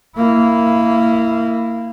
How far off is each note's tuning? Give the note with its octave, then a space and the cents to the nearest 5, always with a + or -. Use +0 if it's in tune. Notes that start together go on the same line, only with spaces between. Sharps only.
A#3 -20 E4 +0